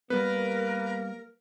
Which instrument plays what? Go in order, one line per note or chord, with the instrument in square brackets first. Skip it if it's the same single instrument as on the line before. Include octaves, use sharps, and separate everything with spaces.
[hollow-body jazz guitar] G3 B3 [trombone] A#3 [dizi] A#4 [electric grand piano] B4